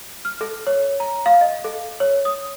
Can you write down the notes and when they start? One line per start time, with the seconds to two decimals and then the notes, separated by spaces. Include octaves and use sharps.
0.25 F6
0.41 A4
0.67 C#5
1.00 A#5
1.26 F5
1.41 D#5
1.64 A4
2.00 C#5
2.25 D#6